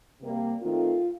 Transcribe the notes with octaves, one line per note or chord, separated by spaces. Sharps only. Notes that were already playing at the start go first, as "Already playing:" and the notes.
C3 G3 A#3
D#3 A3 C4 F4